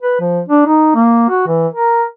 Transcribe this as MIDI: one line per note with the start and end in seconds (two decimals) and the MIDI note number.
0.03 0.15 71
0.21 0.41 53
0.49 0.63 62
0.67 0.94 63
0.95 1.25 58
1.29 1.45 66
1.47 1.67 52
1.74 2.03 70